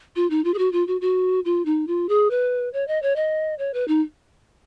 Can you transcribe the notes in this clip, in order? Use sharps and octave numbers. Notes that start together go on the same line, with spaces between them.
F4
D#4
F4
G#4
F#4
F4
F#4
F#4
F4
D#4
F4
G#4
B4
C#5
D#5
C#5
D#5
C#5
B4
D#4